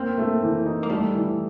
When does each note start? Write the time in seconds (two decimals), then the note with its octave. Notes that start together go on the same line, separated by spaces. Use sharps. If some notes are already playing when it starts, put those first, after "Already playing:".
Already playing: A#3 C4
0.18 A3
0.42 E3
0.65 D#4
0.83 A#3
0.90 G3 A3
1.14 E3